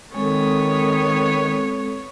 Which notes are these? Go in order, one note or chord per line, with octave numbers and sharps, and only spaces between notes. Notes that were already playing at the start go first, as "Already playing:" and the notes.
D#3 G#3 B3 C4 A4 C#5